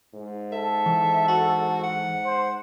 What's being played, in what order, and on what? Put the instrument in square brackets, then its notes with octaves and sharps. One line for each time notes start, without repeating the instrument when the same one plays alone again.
[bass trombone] G#2
[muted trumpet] A4 [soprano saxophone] E5
[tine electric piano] E3
[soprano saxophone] F#4
F#5
[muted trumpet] C5